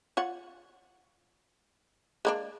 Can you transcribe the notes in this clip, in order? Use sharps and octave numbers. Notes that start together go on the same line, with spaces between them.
F4 C#5 F#5
G#3 A#3 D4